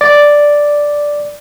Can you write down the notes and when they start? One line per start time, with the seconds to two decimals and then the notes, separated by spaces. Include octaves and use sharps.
0.01 D5